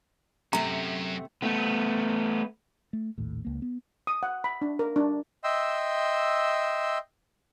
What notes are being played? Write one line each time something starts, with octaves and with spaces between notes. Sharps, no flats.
F#2 C3 A3 A#5
A3 B3
A3
A#1 D#2 A2
C#2 A#3
B3
D#6
F#5
B5
D4
A#4
D4
D#5 E5 G5 C6 E6